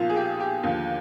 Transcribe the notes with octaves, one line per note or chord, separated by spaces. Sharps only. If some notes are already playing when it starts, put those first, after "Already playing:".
Already playing: B1 A#2 F3 F4
G#4
G4
G4
D#2 D3 F3